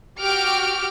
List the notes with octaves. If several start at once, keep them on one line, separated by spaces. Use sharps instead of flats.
F#4 G4 G5 D6 F6 D7